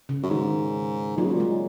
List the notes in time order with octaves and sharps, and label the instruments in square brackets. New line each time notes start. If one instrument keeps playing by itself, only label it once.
[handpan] C#3
[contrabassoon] F#2
[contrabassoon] G#2 [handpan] D#3
[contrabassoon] A#2 [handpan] F#3
[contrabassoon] C#3
A#2
[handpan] G#3